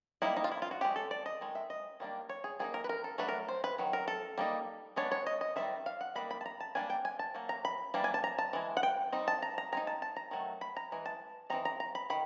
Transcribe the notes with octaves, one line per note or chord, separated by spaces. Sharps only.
G3 A#3 D#4 E4
D#4
F4
E4
F4
F#4
G#3 C#4 G4
A4
D5
D#5
D#3 G#3
E5
D#5
D#3 G3 A#3 D4
C#5
G#4
G3 A#3 D#4 G#4
A#4
B4
A#4
A4
F#3 A3 D4 B4
A#4
C5
B4
D#3 F#3
A#4
A4
G3 A#3 D#4
G#3 B3 D4 C#5
C#5
D#5
D#5
D#3 G3 C4 D#4 E5
F5
F#5
G3 A#3 D#4 B5
B5
A5
A#5
A5
G3 A#3 D4 G#5
G5
G#5
A5
F#3 A#3
A#5
B5
E3 G3 A#3 D4
G#5
A5
A#5
A5
E3 G#3
F#5
G5
G3 C4 D#4
A5
A#5
A#5
G#3 C4 D#4 A#5
A5
A5
A#5
D#3 F#3 A3
B5
A#5
E3 G#3
A5
E3 G#3 C4 D#4 A#5
A#5
A#5
B5
D#3 B5